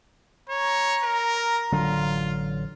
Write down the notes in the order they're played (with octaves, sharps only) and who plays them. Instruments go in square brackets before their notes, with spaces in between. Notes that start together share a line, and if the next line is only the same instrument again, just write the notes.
[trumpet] C#5 [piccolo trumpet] A#5
[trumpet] A#4
[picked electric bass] A1 D3 F#3 [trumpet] F4